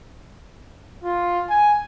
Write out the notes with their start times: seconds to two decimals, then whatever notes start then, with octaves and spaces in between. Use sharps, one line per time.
1.04 F4
1.50 G#5